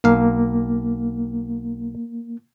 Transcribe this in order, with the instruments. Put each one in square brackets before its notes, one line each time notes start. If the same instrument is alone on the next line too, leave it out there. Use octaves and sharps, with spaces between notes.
[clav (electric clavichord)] B1 F5 [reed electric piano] A#3